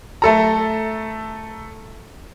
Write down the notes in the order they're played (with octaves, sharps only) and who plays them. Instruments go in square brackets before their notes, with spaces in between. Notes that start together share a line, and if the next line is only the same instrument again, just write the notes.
[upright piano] A3 A4 A#5